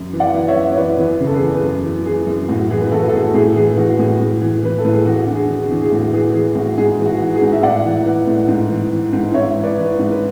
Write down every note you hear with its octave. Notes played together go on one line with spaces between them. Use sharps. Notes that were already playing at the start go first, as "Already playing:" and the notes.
Already playing: F#2
E3
D5 F#5
E3
C#5 E5
F#2
C#5
E3 B4 D5
E2
C#3
A4
G#4 B4
E2
F#2
E3
E3 G#4
F#2
A2 F#4
E3 G#4
B4
E3 F#4 A4
A4
A2 G#4
A2 G#4
E3 G#4
E3 F#4
A2 G#4
A2
E3
E3 B4
A4
A2
G#4
E2 F#4
D3 F#4
G#4
D3
G#4
E2
G#4
A2 F#4
E3 G#4
E3 G#4
A2 F#4
G#2 G#4
E3
F#4
E3
G#4
G#2
E5
A2 D5 F#5
E3
E3
A2
G#2
E3
E3
G#2
G#2 C#5 E5
E3
B4 D5
E3
G#2
B4